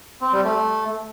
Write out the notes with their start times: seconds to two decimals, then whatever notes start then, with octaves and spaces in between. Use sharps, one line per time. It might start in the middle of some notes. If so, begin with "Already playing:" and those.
0.21 C4
0.33 G3
0.44 A3